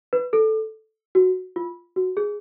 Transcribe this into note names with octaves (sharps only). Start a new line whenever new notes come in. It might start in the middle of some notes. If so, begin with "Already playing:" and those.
B4
A4
F#4
F4
F#4
G#4